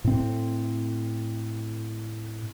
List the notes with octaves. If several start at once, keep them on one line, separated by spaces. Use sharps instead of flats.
A2 C4